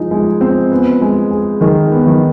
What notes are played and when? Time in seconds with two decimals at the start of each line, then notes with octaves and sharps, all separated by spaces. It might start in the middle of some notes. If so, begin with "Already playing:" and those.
Already playing: F3 G#3 D#4 G#4
0.11 G#3
0.41 C4
0.71 B3
1.02 G#3
1.31 G#4
1.61 D#3 G#4
1.92 B3
2.07 D#3